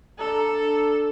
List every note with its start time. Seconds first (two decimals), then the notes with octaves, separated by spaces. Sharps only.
0.19 D4 A4 A#5